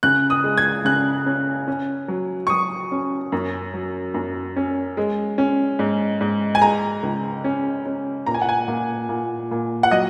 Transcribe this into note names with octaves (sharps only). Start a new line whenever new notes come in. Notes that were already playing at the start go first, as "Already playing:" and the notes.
C#3 F#6
D#6
G#3
G#6
C#3 F#6
C#4
C#4
F#3
C#6
F#3 D#6
C#4
F#2
F#3
F#2
C#4
G#3
C#4
G#2
G#2
G#5
G#3 A#5
C#2
C#4
C#4
A#2 A#5
G#5
F#5
G#5
A#2
A#2
A#2
F#5
F#3 D#5